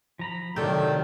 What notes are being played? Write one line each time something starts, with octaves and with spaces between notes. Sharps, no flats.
F3 A#5 B5
C3 D#3 F#3 A3 D4 G5